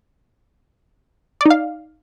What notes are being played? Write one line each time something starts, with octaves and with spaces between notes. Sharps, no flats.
D#4 D5 F5